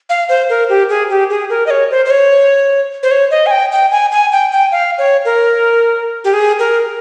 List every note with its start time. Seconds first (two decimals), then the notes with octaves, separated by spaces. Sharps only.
0.09 F5
0.29 C5
0.49 A#4
0.69 G4
0.89 G#4
1.10 G4
1.30 G#4
1.50 A#4
1.66 D#5
1.70 C#5
1.91 C5
2.06 C5
2.10 C#5
3.03 C5
3.11 C#5
3.31 D#5
3.46 G#5
3.51 G5
3.72 G5
3.92 G#5
4.12 G#5
4.32 G5
4.52 G5
4.72 F5
4.98 C#5
5.25 A#4
6.24 G4
6.33 G#4
6.59 A#4